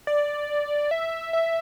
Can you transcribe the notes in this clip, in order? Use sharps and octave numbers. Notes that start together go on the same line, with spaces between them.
D5
E5
E5